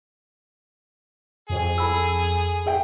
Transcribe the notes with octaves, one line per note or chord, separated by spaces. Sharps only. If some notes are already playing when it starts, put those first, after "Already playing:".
F2 G#4
A4 B5 E6
G#4 E5 G5